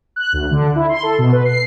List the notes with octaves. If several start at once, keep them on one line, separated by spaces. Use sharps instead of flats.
F#6
D2
D3
E4
C6
A4
B2
B4
C7